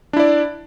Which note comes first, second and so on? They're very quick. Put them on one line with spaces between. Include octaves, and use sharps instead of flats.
D4 E4 D5